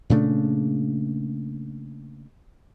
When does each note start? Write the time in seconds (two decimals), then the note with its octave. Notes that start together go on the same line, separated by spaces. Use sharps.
0.10 A#2 C#3 A3 D4